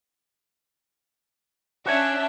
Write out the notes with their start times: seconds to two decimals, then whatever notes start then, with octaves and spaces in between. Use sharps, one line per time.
1.86 C#4 D4 F#4 E5 F#5 G#5